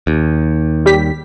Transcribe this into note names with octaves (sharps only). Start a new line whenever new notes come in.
D#2
G3 G4 B6